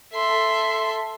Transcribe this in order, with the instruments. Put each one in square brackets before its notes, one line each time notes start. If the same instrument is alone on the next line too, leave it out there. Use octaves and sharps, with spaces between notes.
[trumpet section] A4 [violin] E5 C6